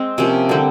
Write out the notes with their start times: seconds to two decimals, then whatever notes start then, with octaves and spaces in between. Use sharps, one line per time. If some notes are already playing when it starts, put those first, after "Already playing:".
Already playing: G#3 C4
0.18 C3 F3 A#3 C#4
0.49 D3 G3 C4